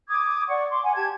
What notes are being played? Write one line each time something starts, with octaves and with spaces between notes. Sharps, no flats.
D6 D#6 G#6
D5 F#5 C#6
C6 D6
F#5 G#5
G4 A5 G#6